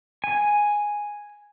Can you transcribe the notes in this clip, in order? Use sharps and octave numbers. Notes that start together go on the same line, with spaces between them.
G#5